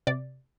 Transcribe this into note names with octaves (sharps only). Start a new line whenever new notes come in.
C3 D5